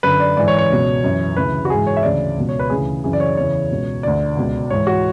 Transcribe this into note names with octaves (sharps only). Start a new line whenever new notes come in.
F#2 D3 B4
D5
G#2 E3 D5
C#5
C#5
C#2 B2
F#2 E3
D2 C#3 E3 B4
F#4
G#2 E3 G#4
C#5
E5
D2 C#3 E3 D5
C#2 B2
C#5
B4
D2 C#3 E3 G#4
F#2 C#3 E3 G#4
D5
C#5
E2 C#3 E3 C#5
C#2 B2
D2 D3 D5
C#2 B2
G#2 E3 C#5
F#4